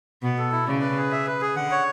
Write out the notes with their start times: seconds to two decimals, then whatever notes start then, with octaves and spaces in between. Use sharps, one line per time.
0.22 B2 B3
0.38 A4
0.52 E4
0.66 C#3 D5
0.81 B4
0.97 G#4
1.12 E5
1.27 B4
1.41 G#4
1.55 D3 F#5
1.71 C#5